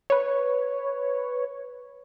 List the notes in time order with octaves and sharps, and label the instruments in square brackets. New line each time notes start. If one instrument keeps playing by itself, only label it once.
[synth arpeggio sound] B4 C#5